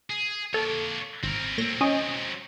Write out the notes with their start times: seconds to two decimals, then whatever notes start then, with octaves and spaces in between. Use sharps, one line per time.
0.10 G#4
0.54 A#3 A4 C#5
1.24 G#1 C4 A#4
1.58 A#2 F#3 C4 A#6
1.81 C#4 D#5